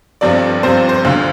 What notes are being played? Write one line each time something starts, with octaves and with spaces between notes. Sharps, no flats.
G1 G2 F3 C4 D5
G1 G2 F3 C4 C5
C5
D2 D3 F3 F5